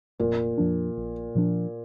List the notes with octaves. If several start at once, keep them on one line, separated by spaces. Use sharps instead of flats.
F1 A#2
F2 F3 D4
A#1
A#2 F3 D4